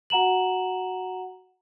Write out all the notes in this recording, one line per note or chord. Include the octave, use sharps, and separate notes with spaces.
F#4 F#5 A#5 E7 F#7